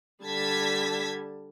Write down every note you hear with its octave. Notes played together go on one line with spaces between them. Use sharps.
D3 G3 A5 G#6 B6